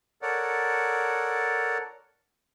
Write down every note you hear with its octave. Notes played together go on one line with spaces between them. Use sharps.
A4 A#4 C#5 D5 F#5